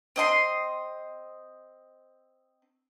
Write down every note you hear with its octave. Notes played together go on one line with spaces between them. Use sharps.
C4 D#5 C6